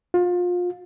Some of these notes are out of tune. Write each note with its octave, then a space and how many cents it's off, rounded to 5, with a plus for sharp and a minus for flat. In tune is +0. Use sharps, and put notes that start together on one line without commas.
F4 +30